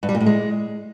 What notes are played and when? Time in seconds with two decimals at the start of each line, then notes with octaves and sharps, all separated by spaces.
0.03 G2
0.09 G3
0.15 A#2
0.20 A2
0.26 G#3